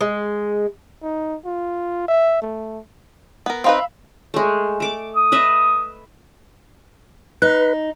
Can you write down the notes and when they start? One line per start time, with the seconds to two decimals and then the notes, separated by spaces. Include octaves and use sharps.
0.01 G#3
1.03 D#4
1.45 F4
2.08 E5
2.42 A3
3.46 B3 A#4
3.64 C4 D#4 B4 E5 F5 B5
4.34 G#3 A3
4.80 A3 D6
5.16 D#6
5.32 B4 D#5 E5
7.42 D#4 B4